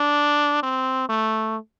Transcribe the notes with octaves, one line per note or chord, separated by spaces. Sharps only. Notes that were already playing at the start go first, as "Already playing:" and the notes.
Already playing: D4
C4
A3